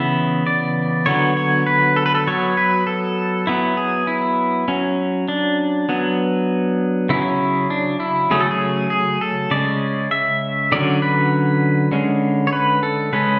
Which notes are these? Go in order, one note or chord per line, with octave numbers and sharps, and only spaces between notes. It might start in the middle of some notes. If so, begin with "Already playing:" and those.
Already playing: C#3 E3 B3 E5
D5
D3 F#3 B3 C#5
C#5
B4
A4
B4
A4
F#3 B3 C#5
B4
A4
F#3 B3 E4
G#4
E4
F#3 C#4
D4
F#3 B3
C#3 F#3 C#4 E4
D4
E4
C#3 F#3 A3 C#4 G#4
A4
G#4
G#4
A4
C#3 G#3 C#4 D5
E5
D3 F#3 C#4 D5
B4
D3 G#3 C#4
C#5
B4
A4
C#3 G#3 C#4 B4